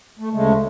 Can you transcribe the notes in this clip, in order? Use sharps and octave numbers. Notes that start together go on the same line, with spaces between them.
A3
D2 C#3 G#3 A3